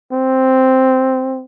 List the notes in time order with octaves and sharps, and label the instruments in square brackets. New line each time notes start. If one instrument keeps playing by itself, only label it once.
[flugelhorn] C4